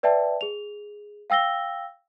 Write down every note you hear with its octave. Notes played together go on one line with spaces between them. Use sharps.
B4 D5 E5 G5 A5
G#4 F7
F5 G5 E6 A#6 G7